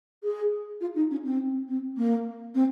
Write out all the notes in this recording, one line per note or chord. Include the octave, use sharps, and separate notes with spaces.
G#4
F4
D#4
C#4
C4
C4
A#3
C4